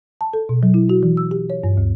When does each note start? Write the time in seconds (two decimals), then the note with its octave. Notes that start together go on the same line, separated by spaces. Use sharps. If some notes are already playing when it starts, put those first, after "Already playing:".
0.21 A5
0.33 A4
0.49 B2
0.63 F#3
0.74 E4
0.90 F#4
1.03 E3
1.17 E6
1.31 G4
1.50 C#5
1.64 G2
1.77 D2